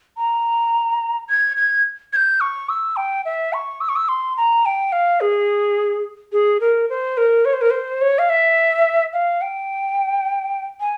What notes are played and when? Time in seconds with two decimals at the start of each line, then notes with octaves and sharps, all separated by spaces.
0.17 A#5
1.29 G#6
1.57 G#6
2.13 G#6
2.16 G6
2.41 C#6
2.69 E6
2.96 G5
3.25 E5
3.53 C#6
3.81 E6
3.89 C#6
3.96 E6
4.08 C6
4.37 A#5
4.66 G5
4.92 F5
5.21 G#4
6.32 G#4
6.60 A#4
6.90 C5
7.17 A#4
7.45 C#5
7.53 C5
7.61 A#4
7.70 C5
8.01 C#5
8.19 F5
8.30 E5
9.13 F5
9.41 G5
10.80 G#5